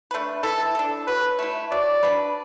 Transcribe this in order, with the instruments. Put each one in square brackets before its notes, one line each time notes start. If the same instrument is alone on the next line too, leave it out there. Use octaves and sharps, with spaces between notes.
[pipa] A3 D4 B4
[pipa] E3 [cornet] A4
[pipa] D4 A4
[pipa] F#3 [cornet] B4
[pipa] A3 E4
[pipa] F#3 [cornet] D5
[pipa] D4 B4